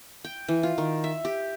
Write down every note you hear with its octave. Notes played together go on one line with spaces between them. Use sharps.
G5
E3
F4
D#3
E5
G4